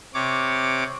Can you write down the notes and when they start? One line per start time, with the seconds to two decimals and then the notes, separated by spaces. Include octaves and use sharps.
0.14 C3 C#5 D6